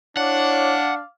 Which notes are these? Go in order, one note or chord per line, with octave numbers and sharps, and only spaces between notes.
D4 E4 C#5 D5 F5 F#5